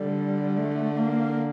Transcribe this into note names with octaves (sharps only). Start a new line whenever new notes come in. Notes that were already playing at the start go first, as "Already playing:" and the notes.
Already playing: D3 G3
A3
A#3